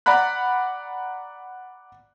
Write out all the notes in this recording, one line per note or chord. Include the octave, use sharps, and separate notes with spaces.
D5 F#5 A#5 B5 F#6